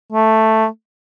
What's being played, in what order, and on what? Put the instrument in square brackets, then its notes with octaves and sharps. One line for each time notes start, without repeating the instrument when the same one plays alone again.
[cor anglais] A3